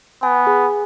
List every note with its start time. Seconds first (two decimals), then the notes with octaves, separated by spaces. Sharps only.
0.23 B3 G#5
0.47 G#4